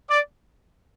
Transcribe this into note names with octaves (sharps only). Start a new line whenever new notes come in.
D5